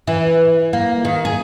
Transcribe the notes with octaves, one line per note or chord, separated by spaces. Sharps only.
E3
A#3
D#3
G#4